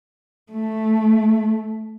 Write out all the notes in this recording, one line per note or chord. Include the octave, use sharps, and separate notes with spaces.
A3